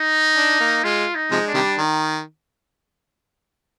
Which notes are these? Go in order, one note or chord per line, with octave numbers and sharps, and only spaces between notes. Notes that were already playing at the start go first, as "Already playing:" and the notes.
Already playing: D#4
D4
A#3
G#3 F4
D#4
C3 F3 G#3
D4
C3 D#3 G3
D#3